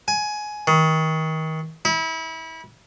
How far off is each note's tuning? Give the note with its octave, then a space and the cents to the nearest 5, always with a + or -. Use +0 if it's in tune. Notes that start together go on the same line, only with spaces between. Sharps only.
G#5 +15
D#3 +30
E4 -30